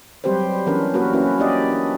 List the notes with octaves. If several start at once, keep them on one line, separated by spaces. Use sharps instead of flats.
F#3 G3 C4 G4 B4 C5
E3 B3 C#4 D4 A#4 B4
A#3 F#4 A#4 B4
A#3 C#4 E4 F#4
D4 E4 G4 D5 D#5
D4